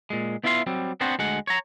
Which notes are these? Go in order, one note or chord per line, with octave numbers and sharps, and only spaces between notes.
A#2 G#3
B3 E4 F4 E5 F5 C6
F#3 G3 C4
B3 C4 D4 F#4 C5 F#5
D2 G#3 F#5
C#5 A#5